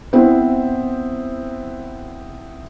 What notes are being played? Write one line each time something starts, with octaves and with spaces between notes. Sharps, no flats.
B3 C4 E4 C5